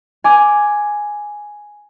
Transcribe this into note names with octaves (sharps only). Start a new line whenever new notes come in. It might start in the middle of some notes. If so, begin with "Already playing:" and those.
G#5 D6